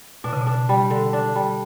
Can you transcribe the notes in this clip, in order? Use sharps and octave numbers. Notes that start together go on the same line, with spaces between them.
B2 D4
C#3
B2
D4
G3
D3
D4
G3